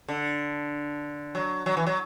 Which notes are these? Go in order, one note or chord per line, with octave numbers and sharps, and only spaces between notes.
D3
F#3
F#3
E3
F#3